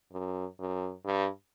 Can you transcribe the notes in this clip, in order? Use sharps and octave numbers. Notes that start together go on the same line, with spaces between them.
F#2
F#2
G2